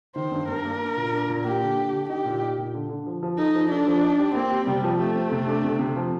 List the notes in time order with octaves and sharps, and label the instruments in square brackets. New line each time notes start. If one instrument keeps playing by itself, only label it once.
[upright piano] D#3 [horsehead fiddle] C5
[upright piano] G2
[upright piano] G2 [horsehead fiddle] A#4
[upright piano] A#3
D4
A#2
D4
A#2
[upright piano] A#3 [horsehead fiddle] G4
[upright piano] D3
D4
D3
[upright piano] D#4 [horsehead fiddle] G4
[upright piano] A#2
D#4
A#2
D3
D3
F3
F3
[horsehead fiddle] D#4 [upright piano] A4
[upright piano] F3
[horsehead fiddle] D4 [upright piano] A4
[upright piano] F3
D#4
G4
[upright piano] A#3 [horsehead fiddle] C4
[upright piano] G4
[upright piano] C3 [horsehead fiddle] G3
[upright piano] F3
[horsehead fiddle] A3 [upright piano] G4
[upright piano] C4
C3
D4
C3
C3
F3